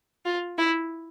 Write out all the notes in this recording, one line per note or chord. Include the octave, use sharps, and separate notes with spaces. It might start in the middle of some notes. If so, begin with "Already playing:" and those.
F4
E4